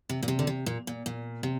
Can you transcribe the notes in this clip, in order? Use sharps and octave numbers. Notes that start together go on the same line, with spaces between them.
C3
A#2
C3
D3
C3
A#2
A#2
A#2
C3